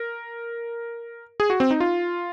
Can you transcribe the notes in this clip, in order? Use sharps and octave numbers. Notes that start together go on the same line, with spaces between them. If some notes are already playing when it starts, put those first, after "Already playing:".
Already playing: A#4
G#4
F#4
C4
D#4
F4